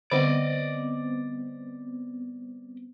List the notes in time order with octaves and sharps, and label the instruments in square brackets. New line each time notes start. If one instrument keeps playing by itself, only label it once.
[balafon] D3 B5 [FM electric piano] G3 B3 C4 [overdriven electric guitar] D5 D#5